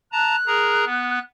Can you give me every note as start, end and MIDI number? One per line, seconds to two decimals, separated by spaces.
0.12 0.36 81
0.12 0.36 82
0.12 1.22 90
0.47 0.85 68
0.47 0.85 70
0.47 0.85 82
0.86 1.19 59